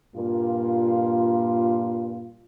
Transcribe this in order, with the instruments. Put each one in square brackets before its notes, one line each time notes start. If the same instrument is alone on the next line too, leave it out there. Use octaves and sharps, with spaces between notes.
[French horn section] G2 A#2 A#3 F4